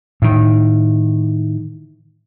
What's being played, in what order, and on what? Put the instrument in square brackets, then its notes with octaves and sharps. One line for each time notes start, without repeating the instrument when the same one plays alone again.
[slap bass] A2 D#3